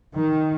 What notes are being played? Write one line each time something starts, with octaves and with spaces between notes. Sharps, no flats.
D#3